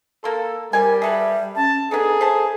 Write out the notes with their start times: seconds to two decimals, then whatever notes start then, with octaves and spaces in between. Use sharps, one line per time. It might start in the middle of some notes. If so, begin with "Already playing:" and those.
0.24 A#3 A4 C6
0.73 G3 C4 A#4 G#5
1.02 G#4 A4 B4 E5
1.56 C#4 A5
1.91 B3 D4 D#4 G#4 A4
2.21 C5 E5 A5